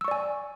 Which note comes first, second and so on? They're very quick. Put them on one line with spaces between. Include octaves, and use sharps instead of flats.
E6 C#6 D5 G#5